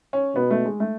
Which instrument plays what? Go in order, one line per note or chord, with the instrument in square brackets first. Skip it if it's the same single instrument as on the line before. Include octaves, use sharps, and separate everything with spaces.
[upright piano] C#4
[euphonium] B2 [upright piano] B3
[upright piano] A3
G#3
A3